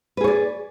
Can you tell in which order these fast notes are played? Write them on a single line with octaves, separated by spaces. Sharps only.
B4 G#4 C#5 D5